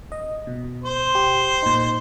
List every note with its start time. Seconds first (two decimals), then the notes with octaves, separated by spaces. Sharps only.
0.12 D#5
0.47 B2
0.84 C5 C6
1.15 G4
1.63 A#2 D#4